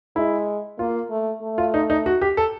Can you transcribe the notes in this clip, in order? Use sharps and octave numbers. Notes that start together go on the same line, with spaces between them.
G#3 E4
A#3 F4
A3
A3
F4
D#4
D#4
F#4
G4
A4